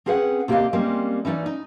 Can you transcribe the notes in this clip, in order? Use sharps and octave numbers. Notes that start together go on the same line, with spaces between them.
C4 C#4 G#4 B4 F#5
C3 A#3 G4 D5 D#5 F5
G3 G#3 A#3 C4 C#4
E3 C#4 D#4 D5
D#4